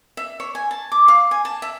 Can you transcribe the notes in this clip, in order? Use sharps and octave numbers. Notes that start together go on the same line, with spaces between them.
E5
C#5
G#5
A5
D6
F5
G#5
A5
E5